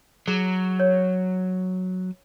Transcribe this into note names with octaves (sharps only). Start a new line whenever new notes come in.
F#3 G#4
C#5